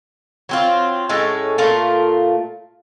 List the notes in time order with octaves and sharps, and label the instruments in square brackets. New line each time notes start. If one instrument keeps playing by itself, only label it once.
[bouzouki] F#3 C4 F4
A2 G#3 C#4 A4
A#2 A3 F4 A#4